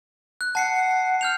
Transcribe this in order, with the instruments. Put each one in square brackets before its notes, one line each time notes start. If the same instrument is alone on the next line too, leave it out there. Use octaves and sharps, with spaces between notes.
[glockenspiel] F#6
[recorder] F#5 [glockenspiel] A5 C7 C#7
[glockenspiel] F6 G6 F7